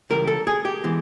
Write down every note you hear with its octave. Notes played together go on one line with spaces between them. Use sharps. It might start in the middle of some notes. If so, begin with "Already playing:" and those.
C#2 C#3 E3 G3 A#4
A4
G#4
G4
E3 G#3 B3